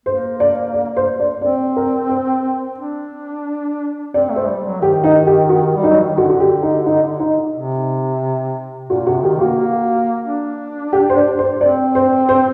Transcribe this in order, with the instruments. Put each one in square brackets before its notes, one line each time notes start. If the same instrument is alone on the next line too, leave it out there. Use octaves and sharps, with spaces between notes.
[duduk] A#3 [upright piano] C5
[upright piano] D5
D5
C5
D5
[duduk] C4 [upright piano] D5
[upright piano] A#4
C5
[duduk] D4
[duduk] C4 [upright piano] D5
[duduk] A3
[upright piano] C5
[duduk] G3
F#3
[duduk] D#3 [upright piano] G4
[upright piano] D#4
G4
F#4
[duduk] G3
[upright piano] D#4
[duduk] F#3
D#3
[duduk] D3 [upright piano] F#4
[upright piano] F#4
G4
D#4
D#4
D#4
[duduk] C3
[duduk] A#2 [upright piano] F#4
[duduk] C3 [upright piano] F#4
[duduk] D#3 [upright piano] G4
[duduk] A#3 [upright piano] F#4
[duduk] A#3
D4
[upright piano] G4
C5
D5
C5
[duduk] C4 [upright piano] D5
[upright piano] C5
C5